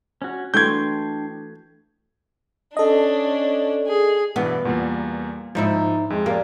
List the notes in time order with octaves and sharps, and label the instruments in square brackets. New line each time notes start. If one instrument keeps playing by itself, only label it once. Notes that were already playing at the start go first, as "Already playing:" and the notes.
[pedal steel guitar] C#4 F#4
[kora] E3 A3 F#4 [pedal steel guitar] D4 G5 C6 [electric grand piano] G6 G#6
[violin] C#4 D4 [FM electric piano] A4 D#5
[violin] G#4
[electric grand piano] G2 B2 E3 [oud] B3
[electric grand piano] E2 G3 A#3 [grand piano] A#2
[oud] G#2 D#4 E4 [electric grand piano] F3
[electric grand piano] F2 [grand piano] G#3
[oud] A#3 [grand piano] G4 D5